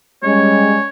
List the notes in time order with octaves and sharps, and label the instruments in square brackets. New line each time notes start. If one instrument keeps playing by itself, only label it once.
[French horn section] G3 G#3 C#4 [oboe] C#5